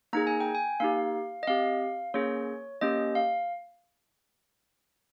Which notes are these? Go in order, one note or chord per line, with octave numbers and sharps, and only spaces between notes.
A#3 D#4 G#4 A#5
G#5
G5
G#5
A#3 D#4 G4 F5
D#5
C4 G4 F5
A#3 C#4 G#4 C#5
A#3 C#4 G4 D#5
F5